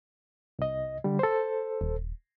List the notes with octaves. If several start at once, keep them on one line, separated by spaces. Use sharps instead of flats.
C2 D#5
D3 G3
A4 C5
D#1